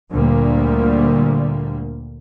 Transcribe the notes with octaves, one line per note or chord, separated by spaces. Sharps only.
D2 A#2 D3 G3 A#3